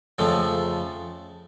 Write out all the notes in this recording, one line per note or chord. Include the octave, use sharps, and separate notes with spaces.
F2 C#3 F3 A3